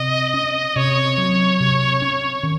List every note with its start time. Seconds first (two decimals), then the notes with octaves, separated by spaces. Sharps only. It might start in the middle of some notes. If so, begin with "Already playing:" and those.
Already playing: C3 D#5
0.34 C#4
0.76 C3 C#5
1.18 F#3
1.60 C3
2.02 C#4
2.43 D#3